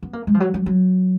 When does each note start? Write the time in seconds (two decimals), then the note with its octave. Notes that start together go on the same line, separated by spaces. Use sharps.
0.03 B3
0.13 A#3
0.27 G#3
0.34 F3
0.40 F#3
0.54 F#3
0.66 F#3